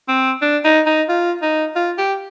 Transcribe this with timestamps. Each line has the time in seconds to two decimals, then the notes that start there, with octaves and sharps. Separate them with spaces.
0.08 C4
0.42 D4
0.64 D#4
0.86 D#4
1.09 F4
1.42 D#4
1.76 F4
1.98 G4